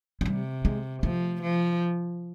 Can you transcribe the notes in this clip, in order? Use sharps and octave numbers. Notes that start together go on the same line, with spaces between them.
G#3
C3 G3
G#3
F3 A3
F3